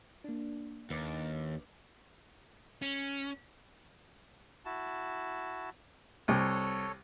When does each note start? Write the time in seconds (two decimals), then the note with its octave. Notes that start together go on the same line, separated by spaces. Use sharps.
0.24 A#3 D4
0.90 D#2 B4 D6 A6
2.82 C#4
4.65 E4 F#4 A5
6.28 C2 A4 C#5